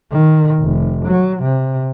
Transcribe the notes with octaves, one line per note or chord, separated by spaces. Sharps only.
D#3
F1
F#3
C3